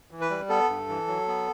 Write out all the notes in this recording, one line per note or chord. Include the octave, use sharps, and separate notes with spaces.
E3
B4
G3
B3 A4
G2
E3
F#3
B3